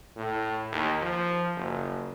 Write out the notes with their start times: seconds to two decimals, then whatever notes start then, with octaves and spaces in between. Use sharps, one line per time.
0.16 A2
0.72 D#2
1.02 F3
1.56 F#1